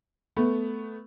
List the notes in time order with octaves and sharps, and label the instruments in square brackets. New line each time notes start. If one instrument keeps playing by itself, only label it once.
[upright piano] A3 B3